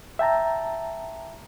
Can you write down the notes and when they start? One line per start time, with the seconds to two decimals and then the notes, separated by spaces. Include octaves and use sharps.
0.19 E5 G5 A5 A#5